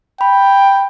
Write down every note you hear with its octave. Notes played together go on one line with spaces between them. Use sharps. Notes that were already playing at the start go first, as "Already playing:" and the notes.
G5 B5